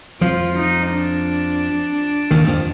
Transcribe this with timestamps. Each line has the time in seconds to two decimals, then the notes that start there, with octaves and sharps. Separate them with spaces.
0.21 F2 F3 F4
0.57 D#4
0.91 D4
2.31 D#2 D#3
2.48 F2 F3